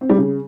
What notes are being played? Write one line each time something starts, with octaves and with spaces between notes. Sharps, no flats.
C4
G3
C#3